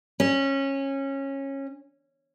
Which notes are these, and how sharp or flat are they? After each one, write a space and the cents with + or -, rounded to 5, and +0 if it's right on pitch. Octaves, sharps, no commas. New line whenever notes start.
C#4 -20